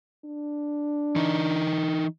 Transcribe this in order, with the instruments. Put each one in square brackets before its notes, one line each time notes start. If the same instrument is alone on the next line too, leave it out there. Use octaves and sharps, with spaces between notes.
[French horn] D4
[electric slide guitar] E3 D#4 D#5